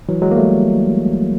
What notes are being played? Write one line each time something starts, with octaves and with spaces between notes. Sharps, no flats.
E3 F#3
F#3 G#3
A#3
G3 A3